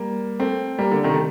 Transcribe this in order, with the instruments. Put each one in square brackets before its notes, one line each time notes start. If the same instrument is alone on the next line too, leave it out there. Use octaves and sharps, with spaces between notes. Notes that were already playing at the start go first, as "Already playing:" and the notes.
Already playing: [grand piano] G3 A#3
A3 C4
G3 A#3
D3
C3 D#3
A3